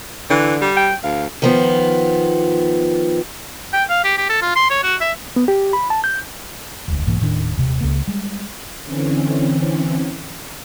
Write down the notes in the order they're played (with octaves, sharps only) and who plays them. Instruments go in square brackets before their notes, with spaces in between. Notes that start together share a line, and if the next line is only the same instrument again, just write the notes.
[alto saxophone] D3 [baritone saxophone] E3
[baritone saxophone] G3
[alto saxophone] G5
[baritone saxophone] D2 [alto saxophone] F5
[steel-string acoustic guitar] D#3 F3 B3
[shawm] G5
F5
G4
G4
A4
F4
C6
C#5
F#4
E5
[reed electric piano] B3
G4
B5
A5
G6
[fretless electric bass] E1 D2
B1 G#2 E3 A#3
D#1 A2 D#3 D4
D#1 C3
C#2 C#3 A#3
G3 G#3
[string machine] D3 E3 C4 C#4